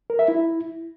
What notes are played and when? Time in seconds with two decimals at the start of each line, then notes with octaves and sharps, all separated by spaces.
0.10 A#4
0.19 E5
0.28 E4